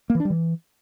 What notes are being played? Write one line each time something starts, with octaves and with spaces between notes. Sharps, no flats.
A#3
E3
D4
G3
E3